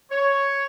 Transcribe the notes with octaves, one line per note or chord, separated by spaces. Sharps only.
C#5